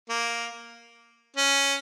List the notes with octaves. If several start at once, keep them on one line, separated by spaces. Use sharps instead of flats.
A#3
C#4